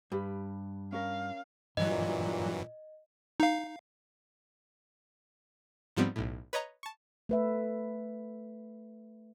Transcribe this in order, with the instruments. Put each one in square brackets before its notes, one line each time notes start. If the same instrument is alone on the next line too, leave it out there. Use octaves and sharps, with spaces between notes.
[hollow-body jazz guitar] G2 [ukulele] G4 B4
[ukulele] C#4 A#4 [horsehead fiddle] F5
[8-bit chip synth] G2 E3 F#3 [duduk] A#2 [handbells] D#5
[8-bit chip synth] D#4 F5
[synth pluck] G#2 F3 G3 B3 C4
B1 A2
B4 C#5 D#5 A#5
A5 C#6
[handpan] A3 B4 E5